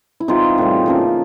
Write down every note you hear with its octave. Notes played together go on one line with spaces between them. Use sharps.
E4
C3 E3 G#3 C4 D#4 F4
A2 E3 G3
C#3 F3 A#3